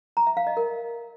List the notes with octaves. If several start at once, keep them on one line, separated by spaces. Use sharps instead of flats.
A#5
E5
F5
D#5
A#4